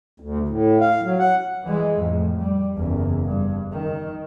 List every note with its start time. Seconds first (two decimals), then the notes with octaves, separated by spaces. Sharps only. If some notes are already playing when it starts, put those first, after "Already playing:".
0.20 D2
0.48 A2
0.80 F5
1.03 F#3
1.19 F#5
1.63 E3 G#3
1.98 F2 A2
2.37 G3
2.75 F#1 E2
3.24 G2
3.71 D#3